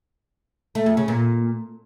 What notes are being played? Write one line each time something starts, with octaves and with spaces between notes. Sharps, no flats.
A3
F2
C#3
A#2